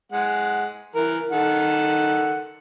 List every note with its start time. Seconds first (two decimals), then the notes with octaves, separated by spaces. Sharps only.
0.12 G#3 F#5
0.95 E3 A#4
1.32 D#3 A4 F#5